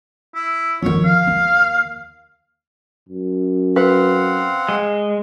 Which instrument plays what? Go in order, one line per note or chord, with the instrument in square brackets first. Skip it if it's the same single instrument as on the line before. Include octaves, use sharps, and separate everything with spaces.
[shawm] E4
[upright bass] F2 D#3 [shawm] C#5
[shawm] F5
[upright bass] D#2
[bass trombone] F#2
[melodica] C4 F5 F#5 [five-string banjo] B4
[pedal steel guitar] G#3